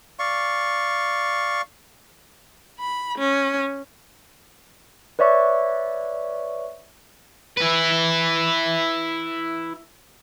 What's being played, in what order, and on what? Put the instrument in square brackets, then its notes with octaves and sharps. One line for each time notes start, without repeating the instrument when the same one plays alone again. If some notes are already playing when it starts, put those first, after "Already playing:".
[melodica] D5 F5 C#6
[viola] B5
C#4
[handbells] B4 C#5 D5 E5 C#6
[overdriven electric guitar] E4 B4